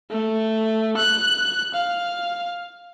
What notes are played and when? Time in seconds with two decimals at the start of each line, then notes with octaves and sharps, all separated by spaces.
0.10 A3
0.97 F#6
1.74 F5